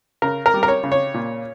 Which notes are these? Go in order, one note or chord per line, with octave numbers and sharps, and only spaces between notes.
C#3 A#4
A#4
G3
A#4
C#5
C#3
C#5
A#2